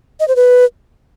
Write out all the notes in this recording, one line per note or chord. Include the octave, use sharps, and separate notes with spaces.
D#5
C5
B4